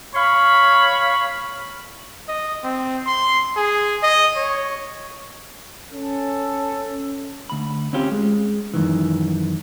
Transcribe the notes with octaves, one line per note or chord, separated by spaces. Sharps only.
C#5 F5 B5
D#5
C4
C6
G#4
D#5
C#5
C#4 A4
D2 B5
C4 C#4 F4 G4
G#3
F#2 D#3 E3